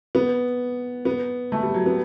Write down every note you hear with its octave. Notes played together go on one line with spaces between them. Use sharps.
B3
B3
A3
G3
F#3
B3